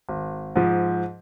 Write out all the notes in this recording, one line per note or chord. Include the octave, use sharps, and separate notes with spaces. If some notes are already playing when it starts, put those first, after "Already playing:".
G#1
G#2 F3